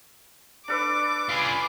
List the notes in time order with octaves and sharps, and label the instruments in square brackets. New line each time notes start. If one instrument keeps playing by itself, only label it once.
[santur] D4 A4 B4 [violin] D6
[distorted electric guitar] F4 G#4 [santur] B5